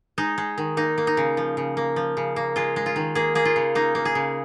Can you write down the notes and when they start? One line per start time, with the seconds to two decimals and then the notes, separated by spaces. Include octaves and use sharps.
0.18 G#3 D#4
0.38 G#3
0.58 D#3
0.77 A#3 D#4
0.98 A#3
1.07 D#4
1.17 C#3
1.37 F3
1.57 C#3
1.77 A#3
1.96 F3
2.17 C#3
2.36 A#3
2.56 G#3 F4
2.76 G#3
2.86 F4
2.96 D#3
3.15 A#3 G#4
3.35 A#3 G#4
3.45 F4
3.56 C#3
3.75 A#3 D#4
3.95 A#3
4.05 G#4
4.15 C#3